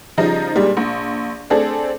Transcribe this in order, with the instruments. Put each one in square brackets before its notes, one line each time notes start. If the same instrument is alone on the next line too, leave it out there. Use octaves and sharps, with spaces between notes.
[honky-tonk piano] C#3 F3 G3 D#4
A#2 G3 G#3 D4
A#1
A3 C4 D4 G#4 A4